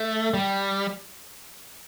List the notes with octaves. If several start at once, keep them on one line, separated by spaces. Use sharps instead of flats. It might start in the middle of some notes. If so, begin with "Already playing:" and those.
Already playing: A3
G3